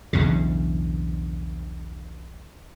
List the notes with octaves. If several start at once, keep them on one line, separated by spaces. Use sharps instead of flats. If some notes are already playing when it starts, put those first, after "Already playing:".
B1 E2 G2 C#3